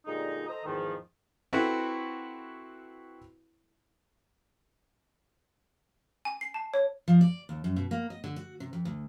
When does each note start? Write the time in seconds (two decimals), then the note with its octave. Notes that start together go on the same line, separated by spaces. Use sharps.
0.06 A#2 D3 G3 G#3 D#4
0.48 A4 C5 D#5 A#5
0.65 E2 G#2 D#3 F3
1.53 C4 E4 F#4 A4 B4
6.25 G#5
6.41 C7
6.54 A5
6.74 C#5
7.08 F3
7.21 D5
7.49 D#2
7.64 F#2
7.76 B2
7.91 A#3
8.10 D#5
8.24 D3
8.36 F#4
8.60 C3
8.73 F2
8.85 D2